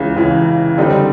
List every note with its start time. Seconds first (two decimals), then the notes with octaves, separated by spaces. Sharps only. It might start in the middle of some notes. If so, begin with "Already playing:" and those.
Already playing: C#2 C#3 E3
0.16 C#2 C#3 E3
0.78 D3 G3 C4 D#4